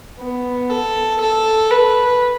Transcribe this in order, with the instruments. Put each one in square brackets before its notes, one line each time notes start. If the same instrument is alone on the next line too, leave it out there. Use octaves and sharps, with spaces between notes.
[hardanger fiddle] B3
A4
A4
B4